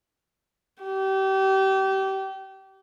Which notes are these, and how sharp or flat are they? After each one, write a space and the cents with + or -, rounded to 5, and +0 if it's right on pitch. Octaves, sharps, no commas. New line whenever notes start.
G4 -30